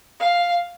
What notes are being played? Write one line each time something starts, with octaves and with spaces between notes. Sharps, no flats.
F5